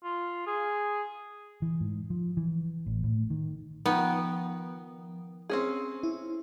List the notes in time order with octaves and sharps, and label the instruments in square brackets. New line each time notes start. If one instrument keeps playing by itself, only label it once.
[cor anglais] F4
G#4
[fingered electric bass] E3
G#2
F3
E3
A1
A2
D#3
[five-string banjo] D#3 [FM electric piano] F3 [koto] B3
[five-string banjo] C4 C#4 G#4
[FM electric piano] E4